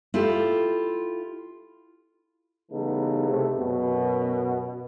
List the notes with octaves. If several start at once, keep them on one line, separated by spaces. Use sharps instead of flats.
E4 F4 G4 A4
C#3 E3 G3 A3 B3 D#4
C3 A3
F#2 B2